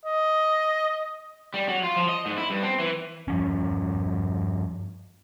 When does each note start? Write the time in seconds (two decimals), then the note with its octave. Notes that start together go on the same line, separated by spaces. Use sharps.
0.05 D#5
1.54 G3
1.68 F#3
1.84 F4
1.96 F3
2.09 D#5
2.26 G#2
2.38 E4
2.50 G2
2.63 C4
2.79 E3
3.28 G2 F3 C#4